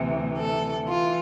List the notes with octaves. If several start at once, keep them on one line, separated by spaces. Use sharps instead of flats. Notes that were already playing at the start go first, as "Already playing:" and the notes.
Already playing: D2 C3 E3
A4
E3 F4